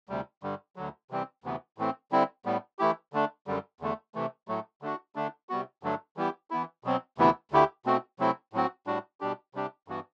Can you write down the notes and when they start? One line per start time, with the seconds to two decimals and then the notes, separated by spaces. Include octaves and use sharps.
0.09 D2 C3 G3
0.43 G2 D3 G3
0.76 D2 D3 F#3
1.10 C3 E3 G3 C4
1.44 D2 C3 E3 B3
1.78 A2 E3 A3 C4
2.12 D3 G3 C4 E4
2.45 A2 G3 B3
2.79 E3 A3 E4 G4
3.13 D3 A3 D4
3.47 F#2 D3 G3
3.80 E2 D3 A3
4.15 C3 E3 A3
4.48 A2 F#3 A3
4.82 D3 A3 D4 F#4
5.15 D3 A3 D4
5.49 C3 G3 B3 F#4
5.83 G2 D3 F#3 A3 D4
6.17 E3 G3 B3 E4 G4
6.51 E3 B3 E4
6.84 B2 F#3 C4
7.18 D2 C3 E3 B3 E4
7.51 D2 D3 A3 E4 G4
7.86 B2 A3 C4 F#4
8.19 C3 F#3 A3 C4 E4
8.53 A2 F#3 C4 F#4
8.87 A2 G3 D4 F#4
9.21 B2 G3 D4 G4
9.54 C3 G3 D4 G4
9.88 G2 E3 B3 F#4